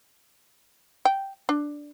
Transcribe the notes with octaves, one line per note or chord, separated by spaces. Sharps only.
G5
D4